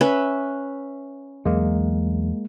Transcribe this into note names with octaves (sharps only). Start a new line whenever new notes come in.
C#4 B4 E5
E2 F#3 G#3 A#3